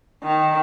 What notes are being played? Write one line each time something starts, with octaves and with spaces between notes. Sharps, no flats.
D#3